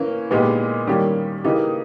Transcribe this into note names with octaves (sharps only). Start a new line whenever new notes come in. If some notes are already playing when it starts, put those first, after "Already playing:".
Already playing: E3 A#3 C#4
A#2 G#3 B3 D#4 G4
D#3 G3 A#3 C#4 G4
C#3 E3 A#3 D#4 G4